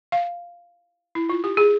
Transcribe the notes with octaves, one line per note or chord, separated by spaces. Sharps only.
F5
E4
F4
G4
G#4